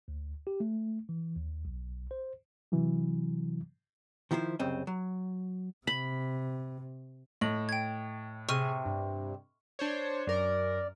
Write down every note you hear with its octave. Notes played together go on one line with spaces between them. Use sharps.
D2
G4
A3
E3
D#2
B1
C5
C3 E3 F#3
D#3 F3 E4 A4 C5
C2 F#2 C#3 C4 D#5
F#3
C3 B5
A2 D#5 F#7
G5 G#6
C3 G#4 C#6 F6 D#7
G2
D4 C5 C#5
F#2 A#4 D5